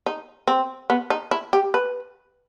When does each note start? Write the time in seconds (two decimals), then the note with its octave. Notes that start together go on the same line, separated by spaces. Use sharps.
0.06 D#4
0.48 C4
0.90 B3
1.10 D#4
1.31 E4
1.53 G4
1.74 B4